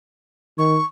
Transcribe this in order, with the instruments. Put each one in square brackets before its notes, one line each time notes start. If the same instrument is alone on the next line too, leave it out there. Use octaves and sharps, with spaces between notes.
[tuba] D#3 [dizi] C#6